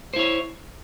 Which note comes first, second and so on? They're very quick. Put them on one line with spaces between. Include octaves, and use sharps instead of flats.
C5 E4 C#5